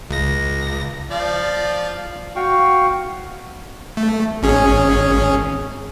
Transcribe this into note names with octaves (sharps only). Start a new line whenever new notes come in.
C#2 A#6
F3 D5 F5
F#4 F5 G5 C#6
A3
G#1 C#4 G#4